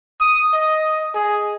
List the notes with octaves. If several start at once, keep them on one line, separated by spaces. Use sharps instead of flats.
D#6
D#5
G#4